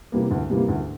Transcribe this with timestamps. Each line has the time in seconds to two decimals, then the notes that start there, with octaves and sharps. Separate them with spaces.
0.12 C3 E3 G3 A#3
0.31 D2
0.50 C3 E3 G3 A#3
0.68 D2